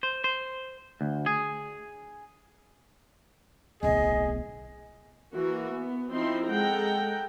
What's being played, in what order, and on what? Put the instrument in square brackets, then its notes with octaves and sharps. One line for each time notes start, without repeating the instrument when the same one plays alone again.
[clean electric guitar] C5
C5
D2
G#4
[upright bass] D1 B1 [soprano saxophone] G#4 [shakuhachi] D#5
[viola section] E3 A#3 F#4
B3
F3 C4 D#4 E4 C6
G#3 A4 F#5 G5 A#5